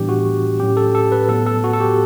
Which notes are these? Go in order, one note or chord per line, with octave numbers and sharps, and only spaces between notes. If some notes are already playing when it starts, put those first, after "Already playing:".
Already playing: A2 E3 G3 B3 D4 G4
F#4
A2 F#3 C#4 G4
A4
A4
B4
A2 F#3 B3 A4
A4
F#4
A4
G4